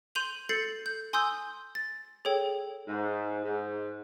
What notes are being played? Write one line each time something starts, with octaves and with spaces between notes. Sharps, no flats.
C6 G6 D#7 F7 F#7
A4 G6 A6 C7 C#7 F#7
G6
G#5 C6 D#6 E6 G6
A6
G#4 A4 C#5 G5
G#2
G#2